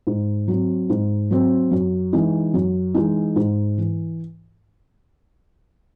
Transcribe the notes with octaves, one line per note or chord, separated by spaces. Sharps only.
G#2
F#3 C4
G#2
F#3 C4
F#2
E3 G#3 D#4
F#2
E3 G#3 D#4
G#2
E3